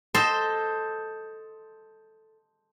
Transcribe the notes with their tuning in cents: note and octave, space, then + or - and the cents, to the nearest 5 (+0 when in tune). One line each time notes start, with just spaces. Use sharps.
A4 +0 C5 +0 D#5 +10